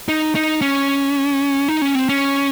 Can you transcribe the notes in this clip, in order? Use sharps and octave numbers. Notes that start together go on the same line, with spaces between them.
D#4
D#4
C#4
D#4
C#4
C4
C#4